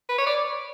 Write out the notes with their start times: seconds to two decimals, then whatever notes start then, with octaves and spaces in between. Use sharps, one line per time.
0.09 B4
0.18 C#5
0.27 D5